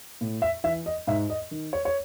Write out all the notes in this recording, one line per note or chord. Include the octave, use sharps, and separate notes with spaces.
A2
E5
E3 E5
D#5
G#2 E5
D#5
D#3
C#5
C#5